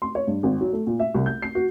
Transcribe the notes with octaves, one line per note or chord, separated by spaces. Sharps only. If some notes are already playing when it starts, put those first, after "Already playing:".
C6
C#5
G2
G#1
F#3
A3
A#2
E5
C2
G6
C7
F#4